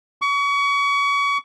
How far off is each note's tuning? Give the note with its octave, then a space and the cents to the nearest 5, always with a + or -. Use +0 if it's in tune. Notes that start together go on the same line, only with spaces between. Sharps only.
C#6 +35